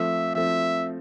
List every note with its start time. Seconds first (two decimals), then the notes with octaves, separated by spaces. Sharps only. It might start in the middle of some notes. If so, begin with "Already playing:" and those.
Already playing: F3 A3 C4 E5
0.35 F3 A3 C4 E5